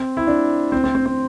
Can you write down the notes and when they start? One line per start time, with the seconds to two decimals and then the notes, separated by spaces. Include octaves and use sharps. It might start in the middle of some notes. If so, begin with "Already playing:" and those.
Already playing: C4
0.17 E4
0.27 D4
0.72 C4
0.84 C4
0.95 C4
1.06 C4